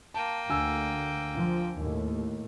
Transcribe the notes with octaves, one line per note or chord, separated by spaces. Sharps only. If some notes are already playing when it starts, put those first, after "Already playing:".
A#3 G5 A5
D2 D3 G#5 E6
F3
D#2 A2